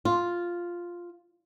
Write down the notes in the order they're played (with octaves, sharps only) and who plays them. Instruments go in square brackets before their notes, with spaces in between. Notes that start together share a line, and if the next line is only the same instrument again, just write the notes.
[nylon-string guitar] F4